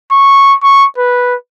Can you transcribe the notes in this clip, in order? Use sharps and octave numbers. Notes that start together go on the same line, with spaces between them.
C#6
C#6
B4